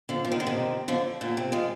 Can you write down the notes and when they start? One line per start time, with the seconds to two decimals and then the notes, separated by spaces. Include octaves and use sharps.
0.09 D3 F3
0.25 F3
0.32 D#3
0.40 D3
0.47 C3 D#3
0.88 D3 F3
1.21 A#2 D3
1.37 C3
1.52 F3 G#3